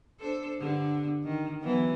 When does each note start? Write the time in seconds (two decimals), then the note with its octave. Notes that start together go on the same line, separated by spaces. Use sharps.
0.20 D4 A4 C5
0.59 G2 D3
1.24 D#3
1.61 E3 F#3 B3